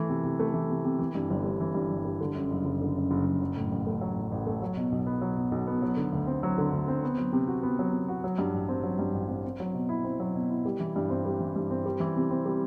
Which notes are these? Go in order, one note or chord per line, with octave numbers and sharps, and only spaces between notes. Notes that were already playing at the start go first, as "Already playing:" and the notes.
Already playing: E3 A3
C3
C3
A3
E3
C3
C3
E3
G2
G1
G3
E3
G2
G1
G3
D3
F#2
F#1
F#1
D3
F#2
F#1
F#1
F#3
A2
A1
A3
F#3
A2
A1
A3
F#3
B2
B1
B3
F#3
B2
B1
B3
F#3
D3
D2
C4
F#3
D3
D2
C4
B3
F#3
C3
F#4
B3
F#3
C3
F#4
F#3
G2
A1
C4
F#3
G2
A1
C4
C4
F#3
B2
E4
C4
F#3
B2
E4
G3
E3
G2
C4
G3
E3
G2
C4
G3
E3
C3
C4
G3